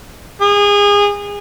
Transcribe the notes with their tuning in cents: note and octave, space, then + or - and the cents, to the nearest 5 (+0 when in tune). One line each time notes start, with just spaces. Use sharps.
G#4 -25